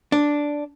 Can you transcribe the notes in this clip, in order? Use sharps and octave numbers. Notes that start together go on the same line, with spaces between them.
D4